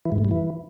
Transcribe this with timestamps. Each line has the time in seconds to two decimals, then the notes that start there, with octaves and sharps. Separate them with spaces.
0.05 E3
0.12 G#2
0.18 A2
0.25 G2
0.31 E3